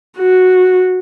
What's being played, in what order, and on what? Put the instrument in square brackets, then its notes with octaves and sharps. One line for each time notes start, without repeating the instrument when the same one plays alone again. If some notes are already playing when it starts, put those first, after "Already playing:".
[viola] F#4